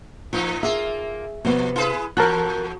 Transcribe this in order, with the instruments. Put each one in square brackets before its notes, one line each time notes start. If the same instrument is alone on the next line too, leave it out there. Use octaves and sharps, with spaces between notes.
[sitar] A2 D#4 [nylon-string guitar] F3
[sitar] A#3 F4 [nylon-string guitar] G#4 [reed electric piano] E5
[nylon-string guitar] C3 B3 [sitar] F3
[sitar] E4 G#4 B4
[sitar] E2 [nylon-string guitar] F#4 [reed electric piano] A#4 A5 F#6